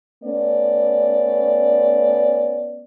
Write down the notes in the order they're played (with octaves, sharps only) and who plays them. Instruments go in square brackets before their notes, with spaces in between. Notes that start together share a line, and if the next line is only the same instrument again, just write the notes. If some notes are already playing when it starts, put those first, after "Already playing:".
[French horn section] A3 B3 C#4 D5